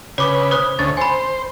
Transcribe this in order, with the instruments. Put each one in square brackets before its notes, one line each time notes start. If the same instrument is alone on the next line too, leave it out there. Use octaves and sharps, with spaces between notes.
[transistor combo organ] C#3 B4 [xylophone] C#5 D6
[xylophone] C5 D#6 F#6
[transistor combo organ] D2 C#4 [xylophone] A6
[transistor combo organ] C5 [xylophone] G#5 B5